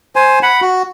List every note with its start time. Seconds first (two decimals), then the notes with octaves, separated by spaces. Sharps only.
0.16 C5 G#5
0.43 F#5 B5
0.61 F#4